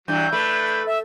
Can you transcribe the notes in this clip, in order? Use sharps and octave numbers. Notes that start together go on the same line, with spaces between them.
G2 E3 F#3 G6
A3 D4 B4
E5